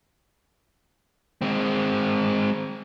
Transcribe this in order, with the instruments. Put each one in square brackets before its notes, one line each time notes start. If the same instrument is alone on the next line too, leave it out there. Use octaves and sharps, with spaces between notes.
[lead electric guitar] G#3 C4